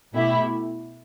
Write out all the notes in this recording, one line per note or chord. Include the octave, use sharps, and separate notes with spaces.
B2 A3 E4 G4